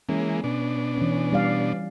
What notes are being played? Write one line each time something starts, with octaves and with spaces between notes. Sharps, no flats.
E3 G#3 A#3 C#4
B2 D4
E3 C#4
G3 D5 F5